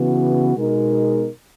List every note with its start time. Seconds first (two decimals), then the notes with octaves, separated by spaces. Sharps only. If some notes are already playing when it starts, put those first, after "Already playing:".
Already playing: C#3 E3 B3 F#4
0.56 B2 G#3 D#4 A#4